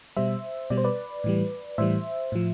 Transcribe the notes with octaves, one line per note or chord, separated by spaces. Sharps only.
B2 G3 C5 E5
B2 G3 D5
C5
B4 D5
A2 E3 G3
A2 E3 G3 C5 E5
A2 F3